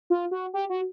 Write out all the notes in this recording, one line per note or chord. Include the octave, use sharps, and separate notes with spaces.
F4
F#4
G4
F#4